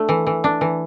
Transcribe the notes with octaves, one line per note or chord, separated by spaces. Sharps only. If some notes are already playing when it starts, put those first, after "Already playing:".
Already playing: A3 D4
E3
E3
D4
E3